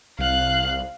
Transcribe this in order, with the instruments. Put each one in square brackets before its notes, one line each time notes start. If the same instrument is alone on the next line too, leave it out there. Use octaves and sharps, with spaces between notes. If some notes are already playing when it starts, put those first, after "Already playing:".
[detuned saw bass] C2 [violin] F5 F#6